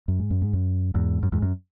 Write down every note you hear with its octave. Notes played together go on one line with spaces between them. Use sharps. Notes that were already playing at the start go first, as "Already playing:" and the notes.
F#2
G#2
F#2
G#2
F#2
E2 G#2
F#2
E2 G#2
F#2